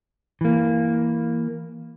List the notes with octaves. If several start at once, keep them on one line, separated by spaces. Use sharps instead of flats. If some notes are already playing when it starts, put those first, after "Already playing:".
E3 A#3